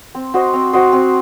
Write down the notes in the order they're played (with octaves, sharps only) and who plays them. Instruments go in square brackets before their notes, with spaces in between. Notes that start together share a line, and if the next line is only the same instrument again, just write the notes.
[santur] C4
F#4 C5 D#5
C4
F#4 C5 D#5
C4